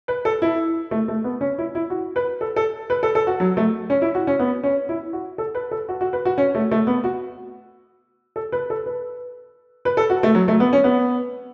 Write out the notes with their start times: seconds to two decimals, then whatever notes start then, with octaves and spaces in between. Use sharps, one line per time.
0.08 B4
0.25 A4
0.42 E4
0.91 A3
1.08 A3
1.24 B3
1.41 C#4
1.58 E4
1.75 E4
1.90 F#4
2.16 B4
2.41 A4
2.56 A4
2.90 B4
3.03 A4
3.15 A4
3.27 F#4
3.40 F#3
3.57 A3
3.90 C#4
4.02 E4
4.15 F#4
4.27 C#4
4.40 B3
4.63 C#4
4.89 E4
5.13 F#4
5.38 A4
5.55 B4
5.71 A4
5.89 F#4
6.01 F#4
6.13 B4
6.25 F#4
6.38 C#4
6.55 A3
6.71 A3
6.87 B3
7.04 F#4
8.36 A4
8.52 B4
8.70 A4
8.86 B4
9.85 B4
9.97 A4
10.10 F#4
10.23 A3
10.35 F#3
10.48 A3
10.60 B3
10.73 C#4
10.84 B3